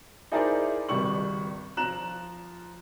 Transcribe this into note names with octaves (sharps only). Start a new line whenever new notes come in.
D#4 E4 G#4 A#4 C5 D5
G#1 C#2 G3 C#6 F#7
F3 F4 A#5 F#6 E7 F#7